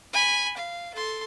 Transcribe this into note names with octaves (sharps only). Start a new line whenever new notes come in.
G#5 B5
F5
A4 C6